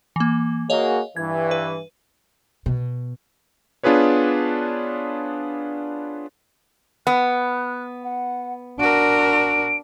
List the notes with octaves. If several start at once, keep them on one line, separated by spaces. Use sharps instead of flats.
E3 A#3
A#3 F#4 G#4 C#5 D#5 F5
G2 E3 G#6
B4
B2
B3 D4 F4 G#4 B4 C#5
B3 F#6
F#5
D4 F#4 A#4 D7